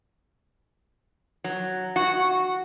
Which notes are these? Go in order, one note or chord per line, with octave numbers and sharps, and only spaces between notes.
F#3
F#4